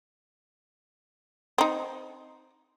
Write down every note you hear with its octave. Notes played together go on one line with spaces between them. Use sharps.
C4 D#4